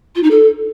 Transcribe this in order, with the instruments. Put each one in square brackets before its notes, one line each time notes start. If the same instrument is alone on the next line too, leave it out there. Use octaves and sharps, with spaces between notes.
[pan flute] F4
D#4
A4